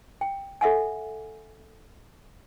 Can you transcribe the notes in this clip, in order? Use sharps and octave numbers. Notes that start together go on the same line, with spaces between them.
G5
A4 E5 F#5 G#5